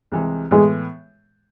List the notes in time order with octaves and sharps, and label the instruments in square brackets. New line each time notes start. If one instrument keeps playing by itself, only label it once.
[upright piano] C2 C3 E3 G#3
[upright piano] A2 E3 B3 [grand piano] G#3